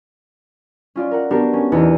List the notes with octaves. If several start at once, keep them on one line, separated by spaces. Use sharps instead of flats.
C#4 F4 D5
A#4 F#5
B3 D4 F#4 G4 A#4
C#4
E2 C3 B3 D4 D#4